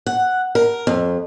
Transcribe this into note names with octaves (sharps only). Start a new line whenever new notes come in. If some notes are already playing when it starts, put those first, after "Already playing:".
F#5
A#4
F2